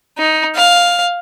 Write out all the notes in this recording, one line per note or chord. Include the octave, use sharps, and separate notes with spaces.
D#4
F5